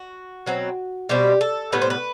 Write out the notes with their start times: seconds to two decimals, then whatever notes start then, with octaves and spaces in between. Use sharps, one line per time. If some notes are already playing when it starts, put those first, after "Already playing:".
Already playing: F#4
0.46 B2 F#3 C4
1.09 B2 G3 C4 G4
1.41 A4
1.72 A2 G3 B3 B4
1.82 C5
1.90 B4